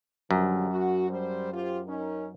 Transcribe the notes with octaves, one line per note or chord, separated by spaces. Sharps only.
F#2 D3 F3 G3
F#4
G3 C5
F4 G4 C5
C#4 D#4 A#4